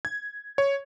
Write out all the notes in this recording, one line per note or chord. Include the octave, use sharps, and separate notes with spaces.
G#6
C#5